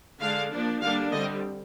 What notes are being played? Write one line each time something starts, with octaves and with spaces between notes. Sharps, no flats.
D3 G#3 D4 F5
F3 A#3 D4
D3 G3 A#3 D4 F5
D3 G3 C4 D#5